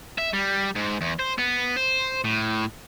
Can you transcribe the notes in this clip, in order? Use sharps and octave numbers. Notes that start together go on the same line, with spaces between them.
E5
G3
G#2
E2
C5
B3
C5
A2